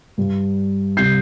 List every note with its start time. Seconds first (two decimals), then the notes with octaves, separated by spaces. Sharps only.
0.18 G2 G3
0.97 C3 G3 G6 C7